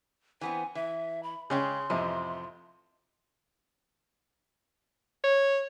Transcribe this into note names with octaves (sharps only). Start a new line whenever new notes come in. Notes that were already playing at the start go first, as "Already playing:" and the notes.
E3 B3 C4 G#5
E3 E5
B5
C#3 G#3 C#4 G5 C6
A1 F2 C3 D#5
C#5